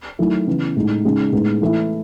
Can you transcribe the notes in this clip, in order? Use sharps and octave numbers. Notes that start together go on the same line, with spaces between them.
D#3 F#3 A3 E4
C#3 E3 B3
A2 G#3 D#4
C#3 G#3 D#4
A2 G#3 B3 D#4
E3 A3 E4